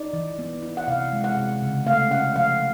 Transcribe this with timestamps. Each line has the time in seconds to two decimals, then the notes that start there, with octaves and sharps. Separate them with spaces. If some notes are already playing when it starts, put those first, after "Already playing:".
Already playing: D#4 D5
0.13 E3
0.39 B3
0.62 E4
0.77 F#5
0.88 C3 F5
1.13 G#3
1.24 F#5
1.37 C3
1.62 C#3
1.86 A3 F5
2.10 C#4 F#5
2.36 F3 F5